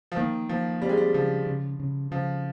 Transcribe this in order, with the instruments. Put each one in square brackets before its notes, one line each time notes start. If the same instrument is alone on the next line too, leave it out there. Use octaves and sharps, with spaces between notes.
[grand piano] F3
[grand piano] D#3 [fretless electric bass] A#3
[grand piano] F3 [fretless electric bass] A#3
[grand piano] G3 [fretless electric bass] C4
[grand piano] G#3
G3
[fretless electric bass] C#3 [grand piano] F3
[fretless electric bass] C#3
C#3
[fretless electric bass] C#3 [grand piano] F3